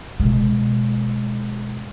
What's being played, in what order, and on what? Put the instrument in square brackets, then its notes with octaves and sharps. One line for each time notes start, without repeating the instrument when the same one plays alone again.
[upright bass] B2 G#3